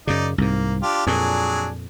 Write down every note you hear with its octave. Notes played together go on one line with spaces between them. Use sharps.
F#2 C#3 D#4 D5
C2 G#2 A#3
D4 F4 G4
F2 A#2 F#3 D4 G#4